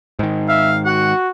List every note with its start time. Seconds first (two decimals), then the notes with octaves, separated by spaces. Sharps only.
0.19 G#2 D#3
0.49 E5 F5
0.85 F#4 F#5